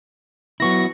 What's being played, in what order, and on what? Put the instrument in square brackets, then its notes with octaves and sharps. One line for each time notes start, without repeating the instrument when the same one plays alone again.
[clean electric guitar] F#3 B3 E4 [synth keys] C#6 A#6